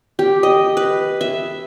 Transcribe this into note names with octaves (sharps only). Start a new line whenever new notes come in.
G4
D#5
B4
E5